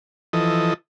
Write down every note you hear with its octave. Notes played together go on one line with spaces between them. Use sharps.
E3 F3 A4 D#5